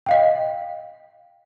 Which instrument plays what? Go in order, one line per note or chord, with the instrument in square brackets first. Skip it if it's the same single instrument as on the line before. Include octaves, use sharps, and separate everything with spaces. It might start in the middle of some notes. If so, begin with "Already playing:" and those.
[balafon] D#5 F5 G5